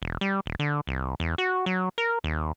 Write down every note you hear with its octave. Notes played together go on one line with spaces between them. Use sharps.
E1
G3
D#1
D3
C2
E2
F#4
F#3
A#4
D#2